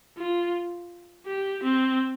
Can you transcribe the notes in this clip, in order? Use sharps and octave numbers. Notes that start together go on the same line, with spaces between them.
F4
G4
C4